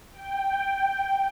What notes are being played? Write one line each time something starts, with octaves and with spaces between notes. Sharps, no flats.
G5